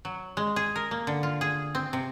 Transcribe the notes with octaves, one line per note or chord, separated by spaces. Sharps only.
F#3
G#3
G#4
A#4
A#3
D3
F4
G#4
C4
C3